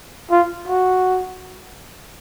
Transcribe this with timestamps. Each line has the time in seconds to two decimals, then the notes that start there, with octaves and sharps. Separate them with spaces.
0.31 F4
0.68 F#4